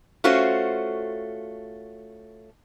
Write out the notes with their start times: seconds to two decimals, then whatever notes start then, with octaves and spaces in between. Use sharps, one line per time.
0.24 A3 C#4 F4 F#4 C5